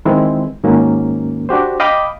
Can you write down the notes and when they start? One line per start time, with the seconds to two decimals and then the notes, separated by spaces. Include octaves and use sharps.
0.05 D#3 E3 G#3 C4 E4
0.63 D#2 G#2 D#3 F#3 A#3 C#4
1.49 D4 F#4 G4 C5
1.80 D#5 F5 G5 B5 D6 D#6